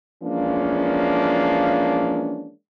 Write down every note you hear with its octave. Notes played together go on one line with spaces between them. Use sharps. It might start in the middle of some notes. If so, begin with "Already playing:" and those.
E3 F3 G#3 A#3 C#4 D4